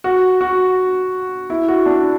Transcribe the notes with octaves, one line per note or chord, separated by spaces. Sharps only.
F#4
F#4
E4
F#4
D4